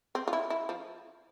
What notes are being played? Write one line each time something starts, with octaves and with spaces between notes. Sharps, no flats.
C4
F4
E4
E4
F3